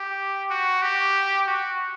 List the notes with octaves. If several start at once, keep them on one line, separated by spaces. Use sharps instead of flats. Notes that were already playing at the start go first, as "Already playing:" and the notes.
Already playing: G4
F#4
G4
F#4